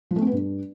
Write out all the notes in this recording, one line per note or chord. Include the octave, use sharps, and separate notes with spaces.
F3
A3
C4
B3
G2